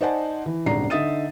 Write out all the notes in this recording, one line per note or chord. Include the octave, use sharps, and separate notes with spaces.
D#4 C5 D5 F#5 G#5 A5
E3
D#1 G#1 C#3 D4 A#5 C7
D3 D#4 E5 D#6 A6 D#7